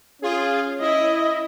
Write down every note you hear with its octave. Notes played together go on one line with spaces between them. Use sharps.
C#4 F4 G#4
E4 D#5